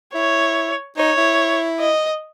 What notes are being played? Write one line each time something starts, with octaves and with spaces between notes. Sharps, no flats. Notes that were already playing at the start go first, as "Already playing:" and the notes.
E4 C#5
D#4 C#5
E4
D#5